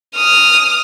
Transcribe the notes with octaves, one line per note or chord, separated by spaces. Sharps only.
D#6 F6